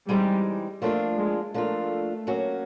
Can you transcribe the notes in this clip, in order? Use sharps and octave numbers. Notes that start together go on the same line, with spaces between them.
E3 G3 G#3 C4 D#4
F3 A3 A#3 D4 F4
G#3
F3 A3 A#3 D4 F4
F#3 A#3 C#4 F#4